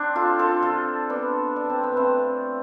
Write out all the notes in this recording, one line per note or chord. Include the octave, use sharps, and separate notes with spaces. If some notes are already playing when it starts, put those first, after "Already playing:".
Already playing: C4 D4
F4 A4
F4 A4
F4 A4
B3 D4
D4
C4
B3
A3 C4